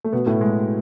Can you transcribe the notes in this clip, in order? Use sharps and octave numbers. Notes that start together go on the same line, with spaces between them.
A3
B2 B3
A2 A3
G#3